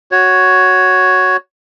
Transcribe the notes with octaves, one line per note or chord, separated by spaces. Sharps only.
F#4 C#5